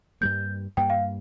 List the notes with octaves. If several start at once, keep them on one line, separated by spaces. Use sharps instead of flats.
G2 G3 A#3 G6
G2 G3 A#3 G5
F5